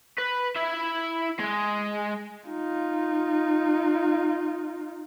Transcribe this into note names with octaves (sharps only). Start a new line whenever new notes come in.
B4
E4 E5
G#3
D#4 F4